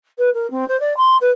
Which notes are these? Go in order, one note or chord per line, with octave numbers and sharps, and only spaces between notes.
B4
A#4
C4
C5
D5
C6
B4